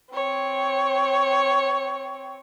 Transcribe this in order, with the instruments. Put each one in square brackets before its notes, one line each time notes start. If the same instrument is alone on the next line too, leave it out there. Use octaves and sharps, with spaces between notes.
[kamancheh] C4 C#5